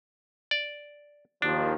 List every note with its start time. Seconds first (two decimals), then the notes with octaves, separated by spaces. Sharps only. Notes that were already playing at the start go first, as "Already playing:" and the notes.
0.51 D5
1.42 D#2 D#3 F3 D4